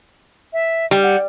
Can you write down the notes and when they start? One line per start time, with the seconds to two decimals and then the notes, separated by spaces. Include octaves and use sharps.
0.53 E5
0.91 G3
1.03 F#5